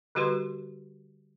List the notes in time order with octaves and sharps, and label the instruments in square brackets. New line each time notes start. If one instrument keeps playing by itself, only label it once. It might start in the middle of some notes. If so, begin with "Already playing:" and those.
[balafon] D3 G3 F#4 G4 B4 C6